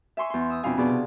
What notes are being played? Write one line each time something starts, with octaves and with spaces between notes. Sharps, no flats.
E5 G#5 C6 C#6
E2 C6
D#6 E6
F2 B2 D4 E4 F5 G#5
B2 B3 G#4 D5 A5
C3